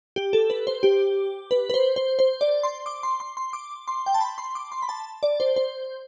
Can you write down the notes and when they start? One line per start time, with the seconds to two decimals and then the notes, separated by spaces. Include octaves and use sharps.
0.16 G4
0.33 A4
0.50 B4
0.67 C5
0.83 G4
1.51 B4
1.70 B4
1.74 C5
1.96 C5
2.19 C5
2.41 D5
2.63 C6
2.86 D6
3.03 C6
3.20 C6
3.37 C6
3.53 D6
3.88 C6
4.06 G5
4.14 A5
4.21 B5
4.38 C6
4.55 D6
4.72 C6
4.82 B5
4.89 A5
5.23 D5
5.40 C5
5.56 C5